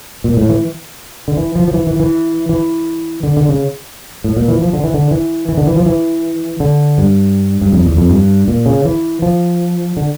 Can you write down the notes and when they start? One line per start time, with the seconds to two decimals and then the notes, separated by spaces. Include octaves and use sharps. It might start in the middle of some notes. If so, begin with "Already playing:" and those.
0.24 A#2
0.37 A2
0.49 E3
1.28 D3
1.37 E3
1.56 F3
1.68 F3
1.74 E3
1.87 E3
2.00 E3
2.49 E3
3.23 D3
3.37 D3
3.49 C#3
4.24 A2
4.36 A#2
4.48 E3
4.61 F3
4.73 D3
4.84 E3
4.94 D3
5.11 E3
5.49 E3
5.57 D3
5.67 E3
5.76 F3
5.86 E3
6.60 D3
6.98 G2
7.61 G2
7.72 F2
7.85 E2
7.97 F2
8.10 G2
8.48 A#2
8.66 C#3
8.85 E3
9.22 F3
9.97 D3